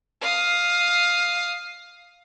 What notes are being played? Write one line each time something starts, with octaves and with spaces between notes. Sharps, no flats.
F5 D#6